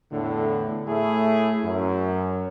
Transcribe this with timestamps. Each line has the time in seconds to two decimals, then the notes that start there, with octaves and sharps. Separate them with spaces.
0.12 E2 A2 D3
0.88 A2 A3 E4 G#4
1.64 F#2